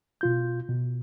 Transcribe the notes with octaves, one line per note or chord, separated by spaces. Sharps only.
B2 F4 G6
B2